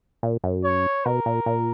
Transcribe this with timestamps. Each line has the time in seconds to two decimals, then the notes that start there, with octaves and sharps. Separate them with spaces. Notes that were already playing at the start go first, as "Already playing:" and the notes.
0.23 A#2
0.44 F#2
0.64 C#5
1.06 B2 A#4
1.26 A#2
1.46 A#2